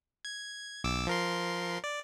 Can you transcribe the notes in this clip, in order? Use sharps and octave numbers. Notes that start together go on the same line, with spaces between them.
G#6
B1 D6 E6
F3 A#4 C6
D5